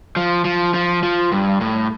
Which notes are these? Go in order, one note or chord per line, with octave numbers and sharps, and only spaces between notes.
F3
F3
F3
F3
G2
A2